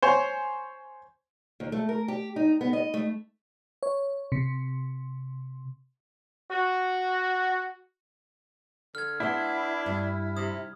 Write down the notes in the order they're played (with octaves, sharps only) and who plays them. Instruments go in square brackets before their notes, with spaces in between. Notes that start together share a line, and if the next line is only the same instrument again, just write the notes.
[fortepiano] C5 C#5 G#5
[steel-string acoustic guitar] D#2
A3
A#4
G4
D#4
B3
D#5
A3
[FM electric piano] C#5
C3
[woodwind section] F#4
[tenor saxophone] D3 [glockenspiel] F6 G#6
[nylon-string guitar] B3 C5 [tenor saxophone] D4 [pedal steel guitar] E4
[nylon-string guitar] G2
[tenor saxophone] C3 [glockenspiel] D#6